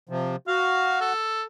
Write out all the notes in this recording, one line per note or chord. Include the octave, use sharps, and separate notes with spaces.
C3 F3
F#4 F5
A4